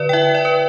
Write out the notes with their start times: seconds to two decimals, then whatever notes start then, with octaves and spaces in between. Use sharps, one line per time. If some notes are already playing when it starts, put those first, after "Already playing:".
Already playing: D3 B4 D5
0.09 G5
0.13 E4 E5
0.35 D5
0.45 B4